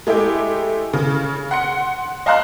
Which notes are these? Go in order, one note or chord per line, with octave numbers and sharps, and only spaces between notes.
G#3 A3 E4 G4
C#3
F#5 C6 C#7
D#5 F5 A5 A#5 C6 F#6